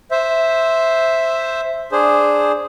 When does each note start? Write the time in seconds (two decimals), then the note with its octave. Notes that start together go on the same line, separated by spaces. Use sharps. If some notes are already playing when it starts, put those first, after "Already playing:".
0.11 C5 E5
1.92 D4 G#4 C5